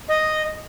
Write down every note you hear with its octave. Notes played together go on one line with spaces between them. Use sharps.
D#5